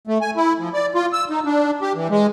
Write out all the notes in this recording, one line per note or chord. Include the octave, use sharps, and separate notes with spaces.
A3
G#5
E4
F3
D5
F4
E6
D#4
D4
G4
E3
G#3